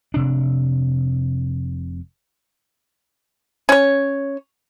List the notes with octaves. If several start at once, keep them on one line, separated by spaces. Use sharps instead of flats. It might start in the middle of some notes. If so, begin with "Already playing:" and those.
F1 C3 D4
C#4 C#5